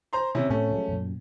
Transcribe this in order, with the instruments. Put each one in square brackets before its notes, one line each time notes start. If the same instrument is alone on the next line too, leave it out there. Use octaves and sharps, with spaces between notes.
[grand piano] C5 A#5 C6
C3 C#4 E4
[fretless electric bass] A2 C4 [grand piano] A3 C#4
[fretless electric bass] F3 F#3 G#3
F#2 A#2